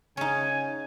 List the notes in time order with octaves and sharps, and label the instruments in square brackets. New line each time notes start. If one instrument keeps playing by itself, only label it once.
[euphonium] C#3 [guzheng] C#4 D#4 [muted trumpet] G#5